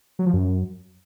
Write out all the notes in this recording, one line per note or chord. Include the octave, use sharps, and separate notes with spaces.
F#3
F3
F#2